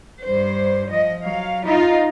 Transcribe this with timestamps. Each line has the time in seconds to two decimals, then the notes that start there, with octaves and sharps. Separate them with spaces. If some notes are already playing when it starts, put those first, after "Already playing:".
0.24 G2 C5
0.90 F3 D#5
1.23 F#3 F5
1.65 D#4 F4